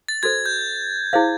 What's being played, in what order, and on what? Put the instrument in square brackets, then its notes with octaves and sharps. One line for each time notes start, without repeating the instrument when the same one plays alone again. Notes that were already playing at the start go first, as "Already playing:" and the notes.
[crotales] A6
[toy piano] F#4 A4 C5 [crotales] G#6
[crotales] G6
[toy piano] E4 G#4 C5 F5